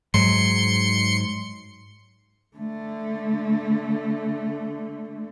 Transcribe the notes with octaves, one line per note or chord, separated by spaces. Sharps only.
G#2 F#3 C6 C#7
D3 A3